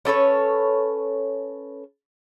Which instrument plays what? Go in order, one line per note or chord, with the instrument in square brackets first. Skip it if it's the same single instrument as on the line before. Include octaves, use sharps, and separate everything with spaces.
[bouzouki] C#4 A4 B4 C#5